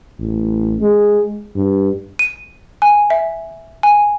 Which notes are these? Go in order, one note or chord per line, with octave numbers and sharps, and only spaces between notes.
A1
G#3
G2
D#7
G#5
E5
G#5